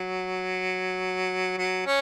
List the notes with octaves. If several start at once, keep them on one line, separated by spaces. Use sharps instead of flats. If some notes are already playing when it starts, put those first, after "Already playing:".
Already playing: F#3
F#3
C#4